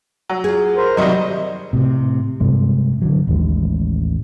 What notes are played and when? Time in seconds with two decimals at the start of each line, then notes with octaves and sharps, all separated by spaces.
0.29 F#3
0.44 F4 G#4
0.76 A#4 C5
0.97 C3 D#3 F#3 G3 D#4 F#4 D#5
1.73 A2 C3
2.40 G2 C3 G#3
3.02 D3 F3 F#3
3.27 A1 D#2 D#3 G#3